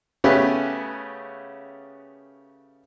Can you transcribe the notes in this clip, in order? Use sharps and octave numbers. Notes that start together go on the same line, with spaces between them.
C#3 A3 B3 C#4 G4 B4